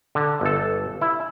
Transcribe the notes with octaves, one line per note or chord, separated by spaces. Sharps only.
D3
G1 A4
E4